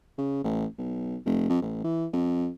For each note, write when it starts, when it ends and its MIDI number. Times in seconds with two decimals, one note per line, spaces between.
0.18 0.43 49
0.44 0.65 33
0.78 1.16 35
1.26 1.47 29
1.49 1.60 41
1.62 1.81 33
1.84 2.06 52
2.13 2.48 41